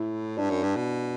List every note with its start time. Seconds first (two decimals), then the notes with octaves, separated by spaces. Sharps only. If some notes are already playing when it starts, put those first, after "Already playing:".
Already playing: A2 E4
0.37 G2 D4
0.50 F#2
0.63 G2
0.76 B2